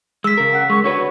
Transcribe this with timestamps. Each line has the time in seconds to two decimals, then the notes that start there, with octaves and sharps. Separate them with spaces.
0.24 G#3 E6 B6
0.37 C#3 A#4
0.53 F#5
0.70 G#3 C#6
0.84 D3 F#4 B4 C#5